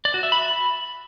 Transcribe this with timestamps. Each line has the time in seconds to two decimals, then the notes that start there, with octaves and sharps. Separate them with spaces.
0.05 D5
0.14 F#4
0.23 E5
0.32 B5